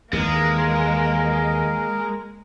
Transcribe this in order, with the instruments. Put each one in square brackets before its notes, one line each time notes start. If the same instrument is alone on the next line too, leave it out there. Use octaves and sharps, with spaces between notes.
[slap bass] D#2 E3 [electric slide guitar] G#3 [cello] A#3 [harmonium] A#4